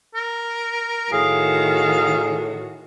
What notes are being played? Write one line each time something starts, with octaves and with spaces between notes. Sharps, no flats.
A#4
A2 D#3 F#4 G#4 F5